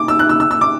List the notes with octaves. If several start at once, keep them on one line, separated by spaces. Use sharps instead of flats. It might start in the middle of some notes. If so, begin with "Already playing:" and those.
Already playing: D6
E6
F#6
E6
E6
E6
D6